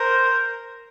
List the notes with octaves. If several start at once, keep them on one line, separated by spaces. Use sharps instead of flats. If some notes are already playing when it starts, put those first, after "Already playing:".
Already playing: A#4 C5